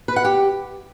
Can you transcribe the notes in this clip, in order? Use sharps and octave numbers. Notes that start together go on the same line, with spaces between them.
B4
F#5
G4